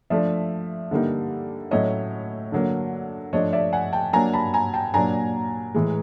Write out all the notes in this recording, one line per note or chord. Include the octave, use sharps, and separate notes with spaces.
F3 A3 D4 D5 E5
D3 G3 A#3 D#4
A2 F#3 A3 C#4 E4 C#5 D#5
D3 F#3 A#3
F3 A3 D4 C#5 D#5
D5 E5
F#5 G#5
G5 A5
F#3 A#3 D4 G#5 A#5
A5 B5
G#5 A#5
G5 A5
A#2 F#3 A#3 D4 G#5 A#5
A2 E3 G#3